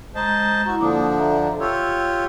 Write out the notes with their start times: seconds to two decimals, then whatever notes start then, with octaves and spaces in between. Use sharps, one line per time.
0.15 G#3 C5 D#5 A5 A#5
0.66 E4 F#4 A#5
0.80 D3 F3 A#3 D4 D6 D#6
1.19 A4 E5 A#5
1.60 F4 G4 C#5 E6